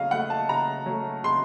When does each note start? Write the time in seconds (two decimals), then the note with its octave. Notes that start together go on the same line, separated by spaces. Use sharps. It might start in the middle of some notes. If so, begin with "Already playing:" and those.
Already playing: C#3 F#3 A3 D#5 F5
0.11 F#3 A3 F#5
0.30 A5
0.49 C#3 A#5
0.86 F#3 A3
1.24 C#3 C6